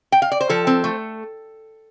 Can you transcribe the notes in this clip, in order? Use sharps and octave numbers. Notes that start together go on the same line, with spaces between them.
G5
F5
D5
C5
F3 A4
C4
A3